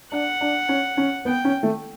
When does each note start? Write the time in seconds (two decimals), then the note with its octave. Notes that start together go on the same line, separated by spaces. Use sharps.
0.12 D4 F#5
0.41 D4
0.69 C#4
0.97 C#4
1.25 B3 G5
1.44 C#4
1.63 A3